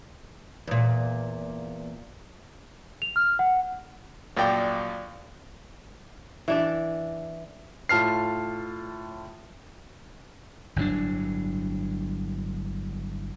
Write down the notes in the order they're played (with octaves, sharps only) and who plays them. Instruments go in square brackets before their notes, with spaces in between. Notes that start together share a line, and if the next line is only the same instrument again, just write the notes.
[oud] E2 A#2
[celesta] F7
F6
F#5
[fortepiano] A#1 F#2 D5 G5
[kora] E3 D4 D5
[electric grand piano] A2 F4 A5 F6 C7
[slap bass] G1 A2 F#3 D4